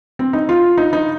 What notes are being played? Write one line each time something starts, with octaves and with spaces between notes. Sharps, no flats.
C4
D#4
F4
D#4
D#4